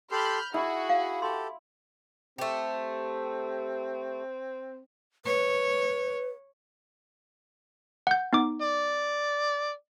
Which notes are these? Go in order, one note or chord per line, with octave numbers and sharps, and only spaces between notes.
G4 A4 B5 C6 F6 G6
E4 F#4 G#4
F5
G4 A4 C6
A3 C4 G4
B4 C#5
F#5 G6
B3 D#4 D6
D5